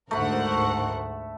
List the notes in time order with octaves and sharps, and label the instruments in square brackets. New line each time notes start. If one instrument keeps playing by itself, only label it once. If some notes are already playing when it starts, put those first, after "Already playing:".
[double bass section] D2 G#2 [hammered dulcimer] A3 B5 [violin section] A#4 C5 F#5